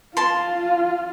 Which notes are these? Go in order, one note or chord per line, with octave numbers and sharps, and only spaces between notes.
F4 A5 C6